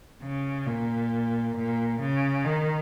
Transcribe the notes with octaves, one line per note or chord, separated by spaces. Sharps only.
C#3
A#2
A#2
C#3
D#3